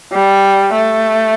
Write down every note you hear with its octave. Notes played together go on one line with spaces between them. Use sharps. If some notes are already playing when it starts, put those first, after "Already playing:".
G3
A3